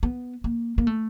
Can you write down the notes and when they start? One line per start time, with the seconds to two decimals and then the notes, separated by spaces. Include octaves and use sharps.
0.03 B3
0.44 A#3
0.78 A#3
0.87 A3